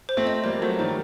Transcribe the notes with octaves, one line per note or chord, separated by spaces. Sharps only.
C5
A3 C4
D#5
G3 A#3 C5
F#3 A3 C5
D#3 G3 C5